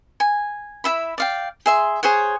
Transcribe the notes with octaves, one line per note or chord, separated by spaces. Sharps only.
G#5
E4 F4 E5 B5
D5 F5 G5
G#4 E5 C6
G#4 C5 C#5 F#5